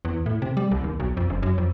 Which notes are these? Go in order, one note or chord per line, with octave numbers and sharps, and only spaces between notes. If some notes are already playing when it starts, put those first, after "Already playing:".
E2
A2
C3
G3
C2
D#2
B1
F2
F#1
F#2
F2